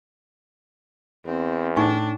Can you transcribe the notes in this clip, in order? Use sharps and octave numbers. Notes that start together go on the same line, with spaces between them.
E2 C4
A2 D4 D#4 G#5 C#6